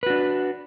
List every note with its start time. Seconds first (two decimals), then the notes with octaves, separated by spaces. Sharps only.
0.03 B4
0.06 F#4
0.10 D4